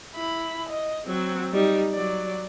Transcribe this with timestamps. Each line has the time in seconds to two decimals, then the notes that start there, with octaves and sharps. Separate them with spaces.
0.14 E4 B5
0.69 D#5
1.07 F#3 C4
1.53 G3 D#4
1.93 F#3 D5